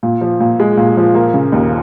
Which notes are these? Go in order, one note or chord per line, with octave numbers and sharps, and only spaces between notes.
A#2
F3
A#2
G#3
A#2
F3
A#3
C#3
D#2